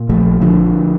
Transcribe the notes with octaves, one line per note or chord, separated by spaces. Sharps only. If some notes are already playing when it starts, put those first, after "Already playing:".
Already playing: A#2
A#1 F3 A3
A#1 D3 F3